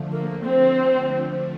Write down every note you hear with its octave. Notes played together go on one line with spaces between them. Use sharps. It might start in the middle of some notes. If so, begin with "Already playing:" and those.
Already playing: D3 F3 A3
A#3
C4